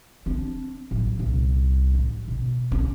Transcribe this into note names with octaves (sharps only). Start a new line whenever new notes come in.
C4 D4
A1 F#3
C2 A#2
A1
B2
C#4